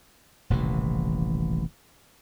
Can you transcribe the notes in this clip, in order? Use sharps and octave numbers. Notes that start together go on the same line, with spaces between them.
D#1 A1 C3 E3